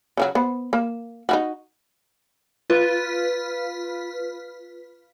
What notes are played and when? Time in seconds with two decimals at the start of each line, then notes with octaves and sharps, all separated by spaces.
0.17 C#3 F3 F#3
0.35 B3 C5
0.73 A#3
1.29 D#4 E4 F#4
2.70 F4 B4